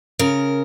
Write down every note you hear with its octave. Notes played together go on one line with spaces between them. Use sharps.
C#3 A#4